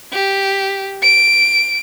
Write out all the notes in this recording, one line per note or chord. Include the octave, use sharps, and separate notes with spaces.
G4
D7